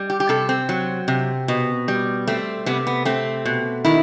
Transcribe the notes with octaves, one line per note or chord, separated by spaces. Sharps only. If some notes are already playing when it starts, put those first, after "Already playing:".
Already playing: G3
G4
G4
C3 A4
C4
F#3
C3
B2
G3
A3 C4
C3 B3
B3
A3 C4
B2
D#3 E4